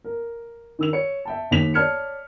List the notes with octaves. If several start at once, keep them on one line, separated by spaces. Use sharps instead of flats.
A#4
D#3 E6 F7
C#5 C#7
E5 G5 A5
D#2 A#3 G5 B6 F7
C#5 D5 A5 F6 G#6 C#7